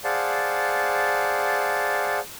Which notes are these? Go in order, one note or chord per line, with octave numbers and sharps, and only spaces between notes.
G#4 C5 D5 F5 F#5 A5